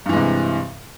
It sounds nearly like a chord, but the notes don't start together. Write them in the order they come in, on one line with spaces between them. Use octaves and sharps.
G2 E3 G#3 C3